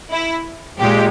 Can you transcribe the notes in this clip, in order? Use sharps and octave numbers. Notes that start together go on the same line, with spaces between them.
E4
A#2 G#3 G4